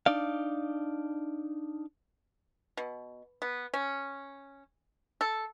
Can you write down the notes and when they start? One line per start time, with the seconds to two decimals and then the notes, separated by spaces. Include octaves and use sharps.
0.06 D4 D#4 D5 F5
2.77 B2
3.42 B3
3.74 C#4
5.21 A4